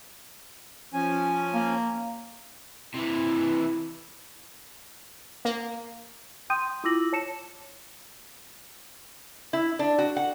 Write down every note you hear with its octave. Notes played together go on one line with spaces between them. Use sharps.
F3 C#4 G#5
A#3
C3 E3 E4
A#3
G5 C6 D#6 G6 D#7
E4 F4 D6 E6 A#6 F#7
C#5 A5 C#7 E7
E4
D4
F#4
F#5